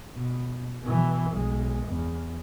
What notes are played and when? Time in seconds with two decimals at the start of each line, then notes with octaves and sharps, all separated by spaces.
0.15 B2
0.82 B2 E3
1.33 B1 G#3
1.87 E2